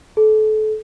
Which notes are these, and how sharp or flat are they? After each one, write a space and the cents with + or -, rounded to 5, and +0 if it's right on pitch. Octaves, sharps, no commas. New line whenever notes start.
A4 -30